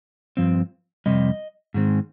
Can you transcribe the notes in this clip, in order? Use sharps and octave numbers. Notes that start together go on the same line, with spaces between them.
G2 F3 C4
F2 C3 G3 D#5
G#2 D#3 G#3 C4